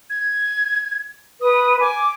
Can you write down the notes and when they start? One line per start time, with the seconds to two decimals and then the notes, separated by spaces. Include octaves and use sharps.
0.10 G#6
1.41 B4 D#6
1.80 G#5 D6